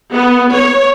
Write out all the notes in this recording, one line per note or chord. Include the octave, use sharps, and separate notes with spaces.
B3
C#5